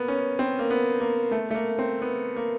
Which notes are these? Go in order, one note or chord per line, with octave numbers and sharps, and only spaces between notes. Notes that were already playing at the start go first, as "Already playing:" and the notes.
Already playing: A#3 B3
C#4
C4
A#3
B3
A#3
A3
A3
A#3
C4
B3
A#3